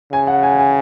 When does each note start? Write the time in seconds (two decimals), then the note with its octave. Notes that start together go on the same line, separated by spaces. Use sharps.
0.12 C#3 G#5
0.27 F#5
0.43 G#5
0.59 G#5